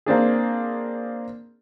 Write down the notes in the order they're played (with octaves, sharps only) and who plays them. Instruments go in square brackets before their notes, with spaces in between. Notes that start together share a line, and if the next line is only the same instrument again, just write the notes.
[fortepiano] A#3 C4 D4 G#4